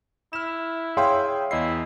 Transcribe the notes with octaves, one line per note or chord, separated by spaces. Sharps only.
E4 F6 E7
G#4 C#5 E5 F5 G5 C6
E2 E4 D#5 C7